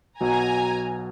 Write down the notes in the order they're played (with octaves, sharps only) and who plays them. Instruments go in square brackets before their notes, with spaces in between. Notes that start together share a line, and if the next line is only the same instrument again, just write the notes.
[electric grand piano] B1 B2 F#3 [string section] G#5 A#5